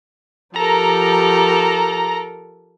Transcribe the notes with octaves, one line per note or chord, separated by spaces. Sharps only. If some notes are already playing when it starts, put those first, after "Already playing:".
F3 G4 A4 A#4 A#5